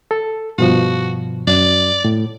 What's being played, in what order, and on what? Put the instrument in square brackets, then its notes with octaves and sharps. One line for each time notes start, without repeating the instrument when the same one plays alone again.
[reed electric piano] A4
[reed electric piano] G2 B2 F3 [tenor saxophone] F#4
[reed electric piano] F#2 [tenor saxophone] D5
[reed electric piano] A2